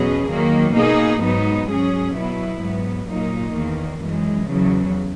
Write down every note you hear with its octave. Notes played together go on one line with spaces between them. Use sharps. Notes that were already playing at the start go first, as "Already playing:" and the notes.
Already playing: E2 B2 F#3 C#4 G#4
D#3 F#3 A#3
B2 A#3 D#4 G#4
G#2 F#3 B3 D#4
G#2 F#3 C#4 G#4
B2 F#3 B3 E4
G#2 F#3 B3
A#2 F#3 A#3 D#4
E2 D#3 A#3
F#2 E3 G#3
E2 C#3 F#3